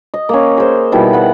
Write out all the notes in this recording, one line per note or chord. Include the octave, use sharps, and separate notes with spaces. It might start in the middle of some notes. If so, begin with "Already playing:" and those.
D#5
A#3 C#4
G#4 C5
B2 D#3 G3 E4
B4 F#5